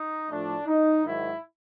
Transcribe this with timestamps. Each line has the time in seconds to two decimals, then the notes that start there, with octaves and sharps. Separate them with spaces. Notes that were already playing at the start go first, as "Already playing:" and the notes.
Already playing: D#4
0.31 A2 F3 A3 D4
0.67 D#4
1.05 G#2 D#3 F#3 E4